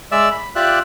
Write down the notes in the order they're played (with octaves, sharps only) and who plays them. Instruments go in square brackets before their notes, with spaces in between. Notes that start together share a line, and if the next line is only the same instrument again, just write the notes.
[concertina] G#3 D5 E5 E6
B5
F4 G4 D5 E5 F#6